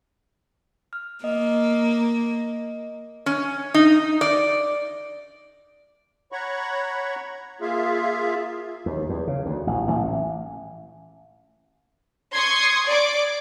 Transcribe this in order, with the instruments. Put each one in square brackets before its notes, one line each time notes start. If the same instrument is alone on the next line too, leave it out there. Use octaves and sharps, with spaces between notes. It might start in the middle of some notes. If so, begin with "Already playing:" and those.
[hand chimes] F6
[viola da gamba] A#3 [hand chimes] D#5
[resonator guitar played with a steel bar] C#4
D#4
D5
[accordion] C#5 F#5 A#5 B5 C#6
A#3 F4 G#4 E5 F5
[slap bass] D#2
E2
C#3
D2
A1
A1
[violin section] C6 C#6 D#6 G#6 C7
D5 D6